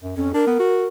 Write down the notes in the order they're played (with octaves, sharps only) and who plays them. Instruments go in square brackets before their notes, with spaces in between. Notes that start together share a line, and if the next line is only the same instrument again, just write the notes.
[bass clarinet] F#2
[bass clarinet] F2 [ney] C#4
[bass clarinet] D4 [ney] A#4
[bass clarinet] B3
F#4